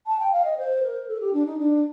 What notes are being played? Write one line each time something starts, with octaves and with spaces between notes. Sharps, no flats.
A5
G5
F5
D#5
C5
A#4
A4
G4
D4
D#4
D4